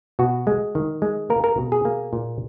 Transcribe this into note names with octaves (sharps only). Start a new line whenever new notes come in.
B2 F#4
G#3
D#3
G#3
A#3 A#4
A#4
B2
G#4
A#3
A#2